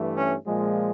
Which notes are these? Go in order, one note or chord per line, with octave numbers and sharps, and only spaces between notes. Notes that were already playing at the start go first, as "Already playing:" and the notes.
Already playing: G2 E3 A3
C#4
A#2 F3 G#3